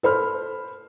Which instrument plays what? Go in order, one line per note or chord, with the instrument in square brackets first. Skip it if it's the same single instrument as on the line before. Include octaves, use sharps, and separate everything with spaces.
[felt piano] A4 C5 B5 F6